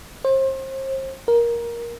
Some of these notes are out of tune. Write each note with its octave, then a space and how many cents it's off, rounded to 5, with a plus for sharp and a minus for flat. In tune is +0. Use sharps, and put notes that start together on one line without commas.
C5 +35
A#4 +15